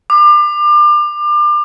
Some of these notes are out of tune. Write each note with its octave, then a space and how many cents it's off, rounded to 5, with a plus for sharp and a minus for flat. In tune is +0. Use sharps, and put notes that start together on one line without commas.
D6 +30